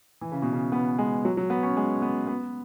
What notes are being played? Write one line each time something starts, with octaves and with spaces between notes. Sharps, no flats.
E3
C#3
B2
C#3
B3
G#3
F#3
F#3
B3
C#4
G#3
B3
B3